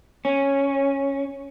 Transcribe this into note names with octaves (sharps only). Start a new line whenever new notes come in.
C#4